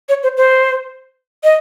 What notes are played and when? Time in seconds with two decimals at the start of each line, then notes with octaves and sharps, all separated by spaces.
0.09 C#5
0.23 C5
0.37 C5
1.44 D#5